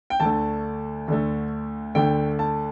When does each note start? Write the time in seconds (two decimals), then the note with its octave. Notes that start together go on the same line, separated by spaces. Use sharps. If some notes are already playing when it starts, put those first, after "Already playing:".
0.10 G5
0.20 D2 D3 A3 A5
1.08 D2 D3 A3
1.95 D2 D3 A3 G5
2.39 A5